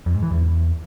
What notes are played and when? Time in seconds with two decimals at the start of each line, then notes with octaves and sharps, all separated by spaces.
0.06 F2
0.14 G#2
0.23 E3
0.31 E2